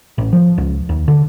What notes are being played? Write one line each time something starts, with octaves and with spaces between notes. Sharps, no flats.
A1
F3
C#2
D#2
D3